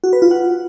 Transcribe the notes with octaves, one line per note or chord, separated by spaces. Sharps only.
F#4
B4
F4
F#5